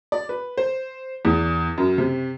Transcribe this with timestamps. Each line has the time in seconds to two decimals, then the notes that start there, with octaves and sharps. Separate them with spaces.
0.12 D5
0.29 B4
0.58 C5
1.25 E2
1.78 F#2
1.98 C3